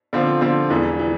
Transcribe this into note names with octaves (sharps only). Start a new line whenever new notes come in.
D3 F3 C4 F4
D3 F3 C4 F4
E1 E2 E3
E3